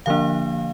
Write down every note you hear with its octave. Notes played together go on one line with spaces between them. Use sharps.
D3 F3 A#3 D4 F5